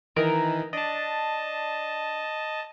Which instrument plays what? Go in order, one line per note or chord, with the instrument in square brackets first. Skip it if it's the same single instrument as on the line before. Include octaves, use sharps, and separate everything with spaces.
[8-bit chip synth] D#3 E3 [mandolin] A#4 D#5
[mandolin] D4 [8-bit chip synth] D#5 A5